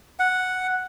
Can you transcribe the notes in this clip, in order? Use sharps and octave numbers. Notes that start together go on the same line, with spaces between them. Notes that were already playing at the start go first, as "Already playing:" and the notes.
F#5